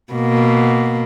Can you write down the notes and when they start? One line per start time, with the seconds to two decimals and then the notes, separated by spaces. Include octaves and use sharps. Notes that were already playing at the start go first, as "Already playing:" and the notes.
0.13 B2 A#3